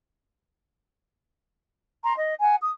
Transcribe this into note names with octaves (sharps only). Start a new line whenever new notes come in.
A#5 C6
D#5
F#5 G#5
D#6